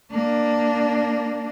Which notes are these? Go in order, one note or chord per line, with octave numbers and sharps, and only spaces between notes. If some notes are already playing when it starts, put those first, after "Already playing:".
A#3 D4